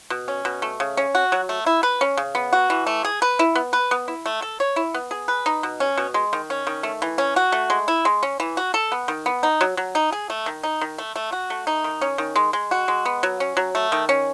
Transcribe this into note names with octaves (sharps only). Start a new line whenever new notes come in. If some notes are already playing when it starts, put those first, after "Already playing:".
B2
C#4
B2
A3
C#3
C#4
F#4
F#3
A3
E4
B4
C#4
C#3
B3
F#4
E3
A3
G#4
B4
E4
B3
B4
B3
E4
A3
A4
C#5
E4
B3
G#4
B4
D#4
B2
C#4
B2
G#3
D#3
C#4
D#3
A3
E3
C#4
F#4
A3
G#3
E4
G#3
C#4
E3
F#4
A4
B3
D#3
B3
D#4
F#3
F#3
D#4
G#4
A3
D#3
D#4
D#3
A3
A3
F#4
A3
D#4
D#3
C#4
D#3
G#3
G#3
F#4
G#3
B3
F#3
C#4
F#3
A3
D#3
C#4